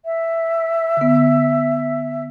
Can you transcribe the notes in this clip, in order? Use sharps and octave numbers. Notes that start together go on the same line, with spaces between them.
E5
D3 B3